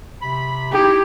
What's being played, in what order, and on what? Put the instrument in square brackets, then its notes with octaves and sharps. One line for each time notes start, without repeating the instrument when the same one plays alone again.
[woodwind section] C3 B5
[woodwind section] D#4 E4 [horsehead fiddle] G4